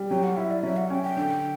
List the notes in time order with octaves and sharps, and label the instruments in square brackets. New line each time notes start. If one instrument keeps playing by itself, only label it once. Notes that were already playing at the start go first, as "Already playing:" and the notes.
Already playing: [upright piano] G3
[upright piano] F#3 [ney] G5
[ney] F#5
[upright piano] E4 [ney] E5
[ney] D5
[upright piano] F#3 [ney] E5
[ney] F#5
[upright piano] C#4 [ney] G5
[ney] G5
[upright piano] D3